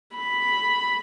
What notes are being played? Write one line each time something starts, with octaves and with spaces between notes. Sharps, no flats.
B5